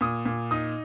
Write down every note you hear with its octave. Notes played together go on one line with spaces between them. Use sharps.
A#2 D#6
A#2
D#4 D#6